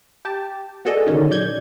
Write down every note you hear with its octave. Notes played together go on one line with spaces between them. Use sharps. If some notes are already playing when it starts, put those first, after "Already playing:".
G4 G5 A5
B3 F#4 G#4 A4 D5 D#5
D3 D#3 A#3 C#4 D#4
A#1 F#3 D5 G6 G#6